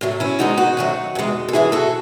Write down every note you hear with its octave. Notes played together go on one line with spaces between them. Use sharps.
A2 F#3 A3
C#4 E4
G#2 D#3 G#3 D#4 F#4
D#4 F#4
F#2 D#3 F#3 A3
E2 C3 E3 G#3
A4
F#2 E3 G#3 E4 G#4
F#4 A4